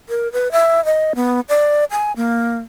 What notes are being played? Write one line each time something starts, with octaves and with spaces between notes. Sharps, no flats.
A#4
B4
E5
D#5
B3
D5
G#5
A#3